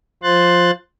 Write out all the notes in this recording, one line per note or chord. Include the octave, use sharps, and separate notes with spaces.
F3 F4 C5 C6 F#6 A6